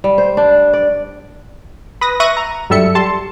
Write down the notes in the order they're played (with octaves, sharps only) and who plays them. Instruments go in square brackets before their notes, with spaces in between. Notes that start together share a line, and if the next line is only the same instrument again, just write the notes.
[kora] G3
C5
D4
D5
[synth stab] B4 D#6 A#6
E5 C#6 F#6 A#6 D#7
A#5
G2 F#3 G3 A4 E5 C#7
G3 A5 C6